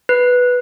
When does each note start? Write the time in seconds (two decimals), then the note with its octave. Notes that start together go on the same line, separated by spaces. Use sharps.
0.09 B4